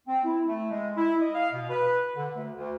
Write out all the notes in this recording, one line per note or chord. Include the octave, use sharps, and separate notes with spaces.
C4
E4
A3
G#3
E4
D#5
F5
B2
B4
D3
D2
D2